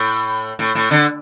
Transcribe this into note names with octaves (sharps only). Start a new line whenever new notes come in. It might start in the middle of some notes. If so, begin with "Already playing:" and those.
Already playing: A2
A2
A2
D3